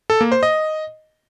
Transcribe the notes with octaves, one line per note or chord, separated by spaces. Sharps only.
A4
A#3
C5
D#5